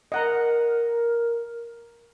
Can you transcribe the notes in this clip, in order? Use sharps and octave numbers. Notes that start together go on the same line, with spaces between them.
A#4 D#5 F#5 A#5